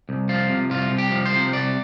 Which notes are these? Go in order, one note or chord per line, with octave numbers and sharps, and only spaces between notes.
C2
F3 F4
C3
C2 F4
C2
G4
F3
C5
C3
C2 D5